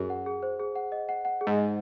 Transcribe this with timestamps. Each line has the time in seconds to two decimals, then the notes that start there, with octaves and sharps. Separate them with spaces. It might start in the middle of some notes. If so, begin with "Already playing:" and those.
Already playing: F#2 G#4
0.10 F#5
0.26 G#4
0.43 C5
0.60 G#4
0.76 F#5
0.92 D#5
1.09 F#5
1.25 F#5
1.41 G#4
1.47 G#2
1.58 D#5